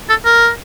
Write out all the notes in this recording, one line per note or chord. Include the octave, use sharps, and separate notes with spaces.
A4
A#4